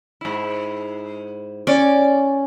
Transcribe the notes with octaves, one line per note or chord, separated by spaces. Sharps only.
G#2 E4
C#4 D5